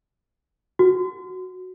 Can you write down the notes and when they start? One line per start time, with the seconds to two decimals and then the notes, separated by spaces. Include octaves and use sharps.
0.79 F#4